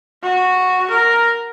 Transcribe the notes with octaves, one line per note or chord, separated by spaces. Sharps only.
F#4
A#4